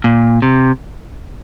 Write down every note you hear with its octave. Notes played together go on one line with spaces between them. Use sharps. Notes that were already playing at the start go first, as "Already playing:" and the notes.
A#2
C3